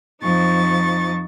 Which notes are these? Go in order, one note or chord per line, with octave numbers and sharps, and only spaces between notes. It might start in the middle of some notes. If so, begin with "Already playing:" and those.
F2 F3 D#4 C#6 A6